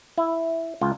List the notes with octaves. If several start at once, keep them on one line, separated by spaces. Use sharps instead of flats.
E4
C#2 F4